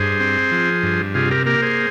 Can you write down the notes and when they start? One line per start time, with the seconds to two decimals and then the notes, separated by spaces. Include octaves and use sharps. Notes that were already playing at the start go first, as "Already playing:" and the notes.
Already playing: G2 G#4 C5
0.20 C4
0.52 F3
0.83 G2
1.14 C3 F4 G#4
1.31 G4 A#4
1.46 A#3 G4 A#4
1.62 G#4 C5